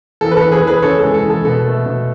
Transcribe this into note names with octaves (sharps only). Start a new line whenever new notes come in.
E2 A4
B4
A4
E2
G#4 B4
E2 G#4 B4
C#3 A4 C#5
G#3 A4
A4
E2 A4
B2 A4
A3
B2